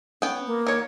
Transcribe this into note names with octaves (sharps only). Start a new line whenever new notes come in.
B3 C#4 G5
A#3
D#3 C#5